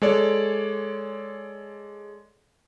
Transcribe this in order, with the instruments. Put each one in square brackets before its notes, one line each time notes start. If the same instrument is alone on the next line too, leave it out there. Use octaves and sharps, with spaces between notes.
[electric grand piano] G#3 A4 C#5 D5